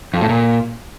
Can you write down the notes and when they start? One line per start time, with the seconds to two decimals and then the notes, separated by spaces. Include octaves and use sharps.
0.14 F2
0.21 A2
0.29 A#2